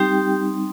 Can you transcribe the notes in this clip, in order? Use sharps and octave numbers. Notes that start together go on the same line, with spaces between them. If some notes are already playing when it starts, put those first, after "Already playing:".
Already playing: G3 C4 D#4 G4 G5